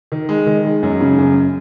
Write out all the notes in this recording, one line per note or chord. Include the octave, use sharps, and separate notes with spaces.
D#3
G#3
D#3
G#3
F#2
C#3
F#2